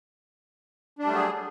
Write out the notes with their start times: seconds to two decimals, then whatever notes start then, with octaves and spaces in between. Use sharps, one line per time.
0.99 D4
1.03 G3
1.07 A3
1.11 F#3
1.15 G#4